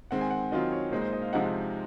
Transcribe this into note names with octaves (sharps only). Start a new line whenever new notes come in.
D#3 G#3 C4 F#5
G#5
F#5
D#3 F#3 C4 F4 D#5
C#5
A#2 G#3 D#4 C5
C5
D#5
F5
C3 F3 G#3 D#4 F#5
F#5